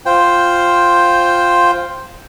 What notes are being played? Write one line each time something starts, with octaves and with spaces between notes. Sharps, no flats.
F4 C5 G5